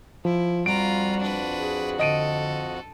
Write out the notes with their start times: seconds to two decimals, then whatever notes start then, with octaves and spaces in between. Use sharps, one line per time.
0.25 F3 E4
0.66 F2 G3 F4 F#4 A#5 D7
1.20 D4 B4
1.57 G#4
1.99 D3 A4 D#5 D7 D#7